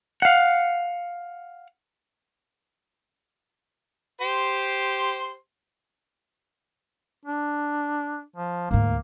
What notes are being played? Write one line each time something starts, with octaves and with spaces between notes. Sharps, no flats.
F5 F#5
G4 C5 C6
D4
F3
D2 G#2 A#3